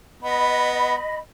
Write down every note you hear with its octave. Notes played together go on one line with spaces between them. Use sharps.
B3 D#5 B5